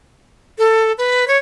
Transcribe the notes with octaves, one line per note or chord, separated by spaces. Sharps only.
A4
B4
C#5